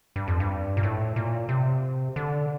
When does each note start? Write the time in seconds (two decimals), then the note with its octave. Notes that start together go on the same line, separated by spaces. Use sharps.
0.16 G2
0.27 F2
0.40 G2
0.77 A#2
0.83 A2
1.16 A#2
1.49 C3
2.16 D3